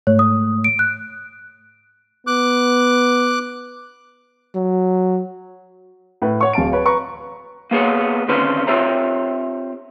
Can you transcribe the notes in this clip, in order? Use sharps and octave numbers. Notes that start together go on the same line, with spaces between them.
G#2 A3 C#5
D#6
D7
F#6
B3 D6 F#6
F#3
A2 B4
C#5 F#5 C#6
D1 F5 A5 D7
B4 C#5
B4 A#5 C#6
A#3 B3 G#4 C#5
D3 D#3 C4 C#4 B4
C4 F4 G4 C#5 E5 A#5